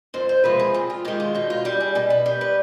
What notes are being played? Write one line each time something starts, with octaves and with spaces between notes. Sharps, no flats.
F2 C5
C5
C3 F3 G#3 B4
G#4
F2 G#4
F4
D#3 G#3 G4
F4
B2 D#4
F4
G3 G4
G#4
B2 B4
B4
G3
B4